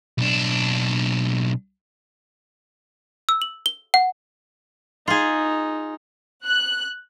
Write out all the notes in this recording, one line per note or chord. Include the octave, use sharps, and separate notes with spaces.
B1 D4
E6
F#7
G7
F#5
D#4 F4 G#4
F#6